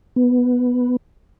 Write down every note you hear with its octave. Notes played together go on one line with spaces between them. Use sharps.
B3